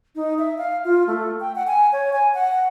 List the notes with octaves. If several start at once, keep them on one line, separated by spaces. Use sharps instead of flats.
D#4
E5
F5
F4
A3
G5
F#5
G#5
C#5
G#5
F#5